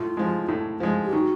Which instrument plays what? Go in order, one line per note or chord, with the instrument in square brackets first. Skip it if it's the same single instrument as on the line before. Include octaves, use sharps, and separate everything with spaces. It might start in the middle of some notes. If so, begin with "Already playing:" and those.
Already playing: [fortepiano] A2 [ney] F4
[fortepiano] F3 G#3
A2
F3 G#3
[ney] G4
[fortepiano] D#3 [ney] F#4